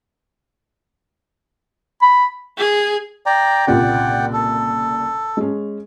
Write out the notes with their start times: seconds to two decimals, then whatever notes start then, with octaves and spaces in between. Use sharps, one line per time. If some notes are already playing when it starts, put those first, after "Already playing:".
2.02 B5
2.58 G#4
3.26 D5 G5 A#5
3.67 C2 A#2 C#3 D5 F#5 G5
4.33 A4
5.37 G#3 C#4